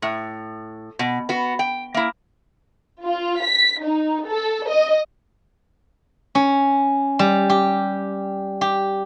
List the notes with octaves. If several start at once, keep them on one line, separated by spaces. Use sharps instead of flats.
A2
B2
B3 F#4
G5
A#3 E4
F4
B6
D#4
A4
D#5
C#4
G3
G4
G4